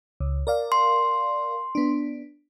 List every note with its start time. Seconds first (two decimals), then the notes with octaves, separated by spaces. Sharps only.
0.20 C#2
0.47 A#4 D5 F5
0.72 C6
1.75 B3 D4